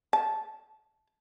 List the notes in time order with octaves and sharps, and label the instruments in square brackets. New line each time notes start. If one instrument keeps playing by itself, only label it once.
[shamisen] A5